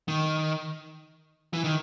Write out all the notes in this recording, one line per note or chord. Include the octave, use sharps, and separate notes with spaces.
D#3
E3
D#3